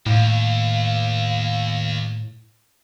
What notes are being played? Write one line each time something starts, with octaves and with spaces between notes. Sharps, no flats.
D#2 A2 F5